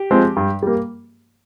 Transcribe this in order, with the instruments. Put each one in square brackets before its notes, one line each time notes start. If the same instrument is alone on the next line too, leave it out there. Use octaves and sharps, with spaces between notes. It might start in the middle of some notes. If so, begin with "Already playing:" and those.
Already playing: [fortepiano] G4
F3 G#3 C4
G2
G3 A#3